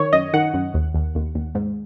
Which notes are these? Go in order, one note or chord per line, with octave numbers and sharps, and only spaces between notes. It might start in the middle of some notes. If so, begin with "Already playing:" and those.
Already playing: D#3 C#5
F#2 D#5
D#3 F#5
F#2
D#2
D#2
D#2
D#2
G#2